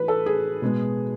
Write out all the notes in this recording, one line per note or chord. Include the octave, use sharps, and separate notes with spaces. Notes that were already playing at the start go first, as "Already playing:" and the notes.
Already playing: A2 E3 B4
A4
G#4
B2 G#3 B3